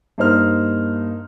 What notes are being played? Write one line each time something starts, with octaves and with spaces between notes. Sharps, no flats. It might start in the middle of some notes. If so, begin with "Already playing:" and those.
G2 A#3 D#4 C5 F6